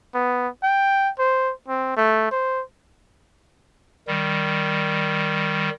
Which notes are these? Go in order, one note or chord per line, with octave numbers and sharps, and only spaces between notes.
B3
G5
C5
C4
A3
C5
D#3 G3